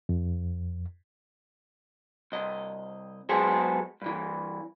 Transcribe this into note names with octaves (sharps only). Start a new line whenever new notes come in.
F2
C2 D#5
F#3 G#3 B3 G#4 A4 C5
G2 E3